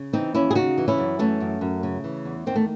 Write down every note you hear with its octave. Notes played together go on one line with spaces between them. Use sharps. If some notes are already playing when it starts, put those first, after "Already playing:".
Already playing: C#3
E3 C4 D#4
D#2 C#4 E4
G#4
C#3 D#4 F#4
E3
C#4 E4
F#2
E3 A3 C#4
F#2
F#2
C#3
E3
E2
D#3 C4
A3